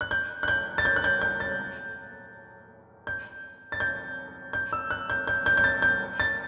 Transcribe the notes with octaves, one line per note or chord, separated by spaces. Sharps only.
F#6
G6
F#6
G6
A6
G6
F#6
G6
G6
A6
G6
A6
G6
G6
E6
F#6
G6
G6
G6
G6
A6
G6
A6